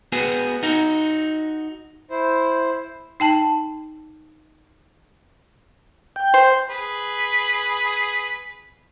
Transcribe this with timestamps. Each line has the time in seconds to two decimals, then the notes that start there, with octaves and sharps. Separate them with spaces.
0.12 B3 F#4 G#4
0.63 D#4 F#4
2.09 E4 C5
3.20 D#4 G5 A5
6.16 G5
6.34 C5
6.70 G#4 B4